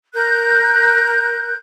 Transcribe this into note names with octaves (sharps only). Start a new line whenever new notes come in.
A#4 F#6 G6